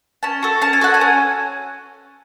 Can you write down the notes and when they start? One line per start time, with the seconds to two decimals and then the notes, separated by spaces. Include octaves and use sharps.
0.23 C#4 A5
0.43 F#4 A4
0.61 C#4 A5
0.73 G#5
0.81 F#4 A4 F#5
0.94 G#5
1.01 C#4